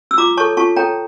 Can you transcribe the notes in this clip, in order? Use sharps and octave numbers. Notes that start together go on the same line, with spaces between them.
E6
F4 A#5 D6
A4 C#5 A5 C#6
F4 A5 C#6
A4 C#5 G5 A#5